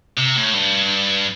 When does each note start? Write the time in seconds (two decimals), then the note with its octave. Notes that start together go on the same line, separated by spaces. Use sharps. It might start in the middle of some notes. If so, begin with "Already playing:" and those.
0.17 C3
0.36 A2
0.53 G2